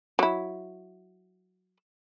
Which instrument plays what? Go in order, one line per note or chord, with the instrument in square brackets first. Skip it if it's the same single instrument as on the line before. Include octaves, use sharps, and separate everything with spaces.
[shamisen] F#3 E4